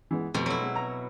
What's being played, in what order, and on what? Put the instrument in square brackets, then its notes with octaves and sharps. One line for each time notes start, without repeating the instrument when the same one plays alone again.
[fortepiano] E3 G#3 B3
[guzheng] F2 B2 [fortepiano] A3 G4
[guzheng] F#3 E4
[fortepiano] G#3 B3
A#5